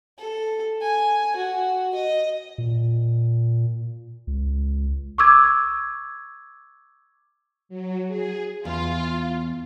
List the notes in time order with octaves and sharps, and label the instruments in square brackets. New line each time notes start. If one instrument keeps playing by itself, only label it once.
[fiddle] A4
G#5
F#4
D#5
[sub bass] A#2
C#2
[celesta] C#6 D6 E6 G#6
[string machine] F#3
G#4
[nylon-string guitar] E2 [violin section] F4